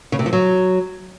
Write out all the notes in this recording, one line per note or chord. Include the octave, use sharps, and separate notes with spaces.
C#3
C3
F3
F#3